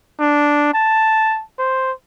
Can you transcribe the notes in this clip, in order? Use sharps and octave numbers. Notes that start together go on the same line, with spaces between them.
D4
A5
C5